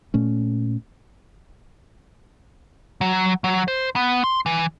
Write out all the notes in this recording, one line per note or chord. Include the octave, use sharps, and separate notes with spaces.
A#2 A3 C#4
F#3
F#3
C5
B3
C6
E3